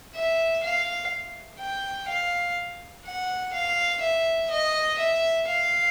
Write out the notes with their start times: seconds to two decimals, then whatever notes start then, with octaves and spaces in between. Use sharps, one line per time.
0.15 E5
0.63 F5
1.60 G5
2.08 F5
3.06 F#5
3.53 F5
4.02 E5
4.50 D#5
4.99 E5
5.48 F5